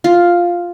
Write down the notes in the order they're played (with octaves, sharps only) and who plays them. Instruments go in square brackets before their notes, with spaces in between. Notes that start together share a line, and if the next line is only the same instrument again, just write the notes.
[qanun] F4